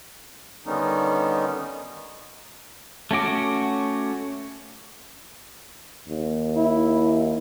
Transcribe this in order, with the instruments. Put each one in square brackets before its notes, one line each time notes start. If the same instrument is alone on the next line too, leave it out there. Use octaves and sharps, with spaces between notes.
[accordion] D3 D#3 G3 B3 C#4 D#4
[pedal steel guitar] A3 C#4 F#4 D6
[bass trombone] D#2
[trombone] E4